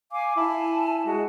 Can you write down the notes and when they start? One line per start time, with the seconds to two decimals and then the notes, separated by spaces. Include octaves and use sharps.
0.11 F5 G#5 D6
0.37 E4 G#5 A5
1.06 G#3 F#4